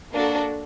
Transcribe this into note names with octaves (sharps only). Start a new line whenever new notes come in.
A#3 D4 F#4 A4